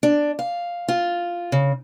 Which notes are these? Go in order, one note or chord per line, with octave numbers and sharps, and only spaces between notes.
D4
F5
F4
C#3